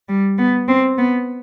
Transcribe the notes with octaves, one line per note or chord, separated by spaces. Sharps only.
G3
B3
C4
B3